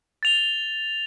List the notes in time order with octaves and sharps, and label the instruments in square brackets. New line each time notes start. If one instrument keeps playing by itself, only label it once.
[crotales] A6 F7 G7